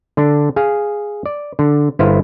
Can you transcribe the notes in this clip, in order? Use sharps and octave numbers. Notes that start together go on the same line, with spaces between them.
D3 D4
G#4 F5
D5
D3
G1 E4 B4 C5 F5